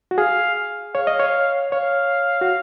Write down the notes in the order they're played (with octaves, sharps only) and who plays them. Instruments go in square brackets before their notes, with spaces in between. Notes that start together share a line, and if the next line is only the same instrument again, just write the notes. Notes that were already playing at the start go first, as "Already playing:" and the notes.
[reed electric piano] F#4
[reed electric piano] G#4 [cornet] F5
[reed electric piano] C#5 [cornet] F5
[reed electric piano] D#5
C#5
[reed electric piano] C#5 [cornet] F5
[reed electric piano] F#4